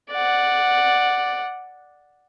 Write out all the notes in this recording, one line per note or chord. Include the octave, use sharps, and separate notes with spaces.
D5 F#5